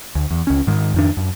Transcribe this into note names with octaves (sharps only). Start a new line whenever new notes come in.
D2
E2
C#2 C#4
G#2 D#3 G#3
F2 D#3 D4
F#2